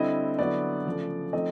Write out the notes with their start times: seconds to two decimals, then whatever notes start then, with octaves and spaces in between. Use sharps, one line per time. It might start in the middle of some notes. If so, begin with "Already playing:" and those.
Already playing: D3 G3 C4 E4 D#5
0.39 D3 F#3 B3 E4 D5
0.86 C#3 F3 A3
1.33 F3 A3 C4 D#4 D#5